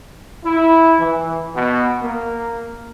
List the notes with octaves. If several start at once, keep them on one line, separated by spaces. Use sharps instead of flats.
E4
E3
B2
A#3